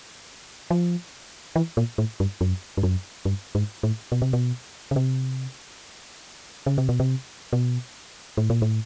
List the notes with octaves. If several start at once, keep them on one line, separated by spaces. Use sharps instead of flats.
F3
E3
A#2
A2
G2
F#2
G2
F#2
G2
G#2
A2
B2
C3
B2
C#3
C3
C#3
C3
B2
C3
B2
A2
A#2
A2